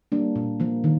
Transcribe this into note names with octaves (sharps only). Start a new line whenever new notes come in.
G3 A#3 D4
A#2
F3 A#3
D#3